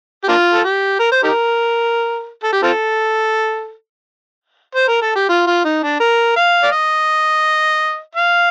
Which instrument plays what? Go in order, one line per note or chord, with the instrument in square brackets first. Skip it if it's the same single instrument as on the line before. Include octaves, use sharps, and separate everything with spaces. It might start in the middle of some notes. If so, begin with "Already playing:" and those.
[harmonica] G4
A#3 D4 F4
A4
G4
A#4
C5
D#4 G4 A#4
A4
G4
C4 F4 A4
C5
A#4
A4
G4
F4
F4
D#4
D4
A#4
F5
D5
D#5
F5